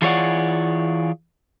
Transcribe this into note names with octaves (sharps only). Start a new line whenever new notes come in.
E3 F4 G#4 C#5 D5 F#5